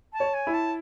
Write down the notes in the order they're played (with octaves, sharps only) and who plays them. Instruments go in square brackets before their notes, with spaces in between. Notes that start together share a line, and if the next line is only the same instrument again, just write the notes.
[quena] A5
[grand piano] C#5
[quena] G#5
[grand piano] E4
[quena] A5